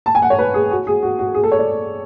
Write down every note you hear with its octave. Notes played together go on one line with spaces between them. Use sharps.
A5
G#5
F#5
C#5
B4
G#4
F#4
G#4
F#4
F#4
G#4
A4
C#5
D5